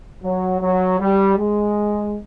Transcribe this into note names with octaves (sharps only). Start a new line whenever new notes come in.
F#3
F#3
G3
G#3